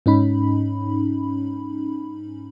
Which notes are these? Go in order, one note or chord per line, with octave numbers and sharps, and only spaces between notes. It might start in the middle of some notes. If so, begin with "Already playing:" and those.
G#2 C#4 D#4 B5